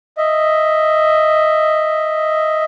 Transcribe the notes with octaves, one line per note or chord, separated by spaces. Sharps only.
D#5 E5